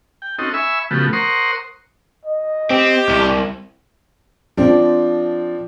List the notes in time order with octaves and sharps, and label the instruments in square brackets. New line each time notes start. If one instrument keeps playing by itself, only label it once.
[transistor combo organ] G5
C4 C#4 D#4 F#4 A4 D#5
E5 G#5 B5 C#6 E6
C#3 F3 A3 B3 F#4 G4
A#4 C5 F#5 C6 C#6 D#6
[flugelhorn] D#5
[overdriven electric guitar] C4 [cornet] G4
[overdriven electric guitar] C2
[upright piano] F3 C4 D4